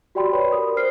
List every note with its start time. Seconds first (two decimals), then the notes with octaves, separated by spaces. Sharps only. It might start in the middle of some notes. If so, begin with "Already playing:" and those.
0.15 F#4 G4 D5 G5 B5 C6
0.33 B4 C#5 D5 B5
0.52 A#4 D#6
0.77 C5 F6 C7